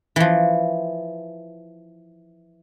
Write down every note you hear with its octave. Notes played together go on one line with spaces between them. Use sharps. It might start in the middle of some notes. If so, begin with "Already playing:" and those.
E3 F3